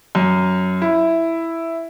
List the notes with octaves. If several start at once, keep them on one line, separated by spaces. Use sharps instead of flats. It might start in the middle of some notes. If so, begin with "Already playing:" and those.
F#2
E4